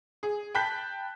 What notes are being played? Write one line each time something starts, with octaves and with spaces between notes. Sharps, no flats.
G#4
G5 A5 B5 F#6 G6 B6